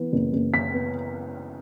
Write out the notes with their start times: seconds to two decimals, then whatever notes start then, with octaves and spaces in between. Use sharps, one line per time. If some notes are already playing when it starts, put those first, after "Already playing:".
Already playing: E3 B3
0.13 F#1
0.33 F#1
0.54 F#1 B6
0.74 B3